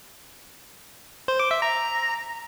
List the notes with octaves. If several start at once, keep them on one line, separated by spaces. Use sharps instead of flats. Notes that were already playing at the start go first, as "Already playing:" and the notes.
C5
D6
E5
A#5